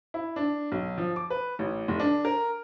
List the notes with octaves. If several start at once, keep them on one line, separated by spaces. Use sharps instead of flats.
E4
D4
B1
F3
D6
B4
A1
F1
D4
A#4